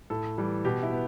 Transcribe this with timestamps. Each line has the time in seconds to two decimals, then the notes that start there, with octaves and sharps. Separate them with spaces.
0.10 A2 A4
0.38 E3 G3
0.64 B2 G4
0.83 E4
0.92 B3